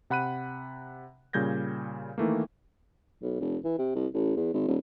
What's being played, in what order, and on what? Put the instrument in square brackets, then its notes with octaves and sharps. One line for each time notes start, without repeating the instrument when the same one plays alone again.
[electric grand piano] C3 F#5 B5 F#6 D#7
A#2 C#3 G3 G6 G#6 A#6
D#3 E3 A3 A#3
[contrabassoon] B1
F1
E3
C3
C2
A1
E2
G#1
D#1